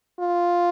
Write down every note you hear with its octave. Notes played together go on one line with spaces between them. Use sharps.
F4